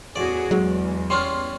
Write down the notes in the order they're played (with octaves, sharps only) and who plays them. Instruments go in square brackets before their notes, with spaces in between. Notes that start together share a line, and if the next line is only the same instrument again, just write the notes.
[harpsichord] A1 D5 [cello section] E2 F#4 G#4
[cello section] E2 [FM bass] F#3 [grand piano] G#3
[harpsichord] G3 C#4 F4 [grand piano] C6 F6